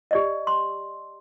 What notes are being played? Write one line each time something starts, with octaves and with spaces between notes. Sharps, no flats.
G4 D5 D#5
C6